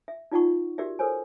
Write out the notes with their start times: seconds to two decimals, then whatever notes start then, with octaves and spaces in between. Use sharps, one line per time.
0.08 E5
0.31 D#4 F4 D5 F#5 A5 C#6
0.78 F#4 G4 A#4 D5 E5
0.99 A4 A#4 C5 C#5 G#5